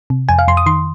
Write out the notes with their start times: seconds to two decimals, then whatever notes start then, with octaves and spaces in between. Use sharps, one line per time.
0.10 C3
0.29 F2 G#5
0.39 F5
0.48 F2 C6
0.57 D#6
0.66 D#3 C6